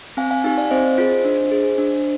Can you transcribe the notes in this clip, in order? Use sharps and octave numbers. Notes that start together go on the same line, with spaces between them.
C4 F5 G#5
F5 G#5
D#4 G4 F5 G#5
D5 F5
C4 C5 D#5
F4 G#4
D4
G#4
D4